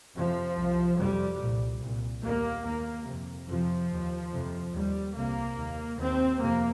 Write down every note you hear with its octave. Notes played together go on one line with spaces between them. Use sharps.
F2 C3 F3
C2 C3
F2 C3 G3
C2 A#2
C2 A#2
D#2 A#3
D#2 A#3
F2 C3
F2 C3 F3
D#2
F2 C3
D#2 G3
C2 C3 A#3
D#2
D#2 C4
F2 C3 A#3